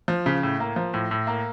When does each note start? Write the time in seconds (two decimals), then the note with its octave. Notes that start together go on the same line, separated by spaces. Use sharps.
0.08 F3
0.26 C#3
0.43 A2
0.60 A#3
0.76 F3
0.94 A2
1.11 A2
1.27 A#3